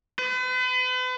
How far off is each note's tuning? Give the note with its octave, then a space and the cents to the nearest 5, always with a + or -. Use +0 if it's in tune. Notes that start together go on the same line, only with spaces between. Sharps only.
B4 +40